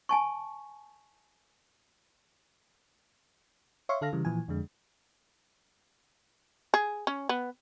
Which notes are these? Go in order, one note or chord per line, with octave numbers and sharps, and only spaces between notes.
G#5 A5 C#6
C#5 E5 F5 C6 C#6
D3 A4 F5 F6 A#6
C#3 E3 G3
A#2 E3 F3 G#5
F2 D3 G#3
G#4
C#4
B3